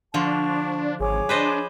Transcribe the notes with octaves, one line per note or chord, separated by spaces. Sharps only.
D3 F3 D4 A5 C#6
G#1 G#4 C#5 D6
D4 B4 C5 D#5